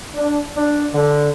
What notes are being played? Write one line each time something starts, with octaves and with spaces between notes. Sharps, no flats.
D4
D4
D3